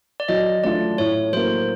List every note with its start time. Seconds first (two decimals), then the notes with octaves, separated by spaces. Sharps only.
0.20 D5
0.28 F#3 D#5
0.64 A3 D4 F4 D5
0.98 A2 C#5
1.33 F#3 A#3 C5